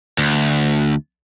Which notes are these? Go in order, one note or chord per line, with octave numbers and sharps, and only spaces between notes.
D2